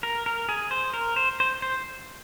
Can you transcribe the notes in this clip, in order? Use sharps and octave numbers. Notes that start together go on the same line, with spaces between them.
A#4
A#4
G#4
C5
A#4
C5
C5
C5